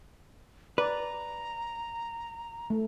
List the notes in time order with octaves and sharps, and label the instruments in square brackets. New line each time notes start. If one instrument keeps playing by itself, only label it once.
[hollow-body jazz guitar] B4 [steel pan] D5 [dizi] A#5
[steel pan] A3